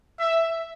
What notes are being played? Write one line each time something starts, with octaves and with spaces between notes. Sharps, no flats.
E5